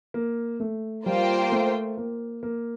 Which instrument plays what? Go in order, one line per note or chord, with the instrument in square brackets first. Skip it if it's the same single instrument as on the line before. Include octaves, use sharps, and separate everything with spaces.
[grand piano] A#3
A3
[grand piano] G3 [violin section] A#3 F4 C5 G5
[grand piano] A3
A#3
A#3